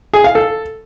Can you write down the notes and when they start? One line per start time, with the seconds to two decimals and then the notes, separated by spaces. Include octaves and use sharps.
0.13 G#4
0.24 F5
0.35 A4